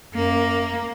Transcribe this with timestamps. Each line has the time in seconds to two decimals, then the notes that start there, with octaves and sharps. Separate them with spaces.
0.14 F#2 A#3